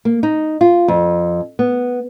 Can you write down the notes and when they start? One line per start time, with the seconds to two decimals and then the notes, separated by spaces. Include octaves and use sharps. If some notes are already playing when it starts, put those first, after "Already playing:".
0.05 A#3
0.23 D#4
0.61 F4
0.88 F2
1.59 B3